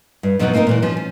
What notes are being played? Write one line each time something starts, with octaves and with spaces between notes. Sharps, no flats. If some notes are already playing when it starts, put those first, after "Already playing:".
G2
F2 B2 F#3 B3 D4 D#4
A#3 C4 D#4 F#4 A#4
A#2 E3 A#3
F3 C#4
C#4